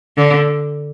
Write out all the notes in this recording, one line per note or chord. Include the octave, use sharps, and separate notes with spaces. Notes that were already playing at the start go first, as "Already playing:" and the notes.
D3